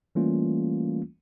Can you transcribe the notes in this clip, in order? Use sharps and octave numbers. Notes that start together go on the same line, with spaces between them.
E3 G3 A3 A#3 C#4 F4